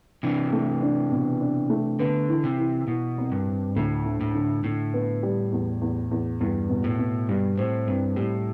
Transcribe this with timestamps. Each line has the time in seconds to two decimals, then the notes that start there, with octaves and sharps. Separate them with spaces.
0.23 C3 E3 D4
0.52 A3
0.82 D4
1.11 B2
1.41 D4
1.70 A3
1.99 D3 B3
2.29 E3
2.44 C3
2.58 E3
2.88 B2 E3
3.18 C2
3.32 G2
3.47 C3
3.76 D2 A2
4.05 D3
4.21 A2
4.34 D3
4.64 A2 D3
4.94 B3
5.23 G3
5.52 E2
5.81 E2
6.11 E2
6.40 E2 G2
6.69 B2
6.84 A2
6.99 B2
7.29 G2 G3
7.57 A2 C4
7.87 C2 G2
8.16 A2 G3